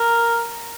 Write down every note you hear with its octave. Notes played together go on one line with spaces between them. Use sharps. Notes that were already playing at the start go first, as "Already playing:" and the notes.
Already playing: A#4